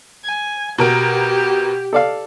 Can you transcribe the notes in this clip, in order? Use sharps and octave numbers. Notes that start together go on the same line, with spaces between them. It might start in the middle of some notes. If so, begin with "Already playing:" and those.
G#5
B2 G4 A#4 D7
A4 D5 F5